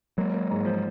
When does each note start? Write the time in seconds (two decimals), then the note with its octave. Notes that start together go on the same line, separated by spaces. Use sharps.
0.18 F#3 G#3 A#3
0.34 A#3
0.51 G#2
0.66 F3